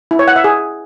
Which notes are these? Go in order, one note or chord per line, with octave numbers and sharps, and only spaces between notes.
E4
C#5
F#5
E5
G#4